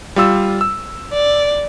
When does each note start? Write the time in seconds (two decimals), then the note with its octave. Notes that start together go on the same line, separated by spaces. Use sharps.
0.16 G3 F4 E6
0.61 E6
1.13 D5